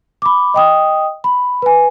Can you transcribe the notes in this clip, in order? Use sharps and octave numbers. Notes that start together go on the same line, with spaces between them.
B5 D6
D#5 G5 D#6
B5
B4 G#5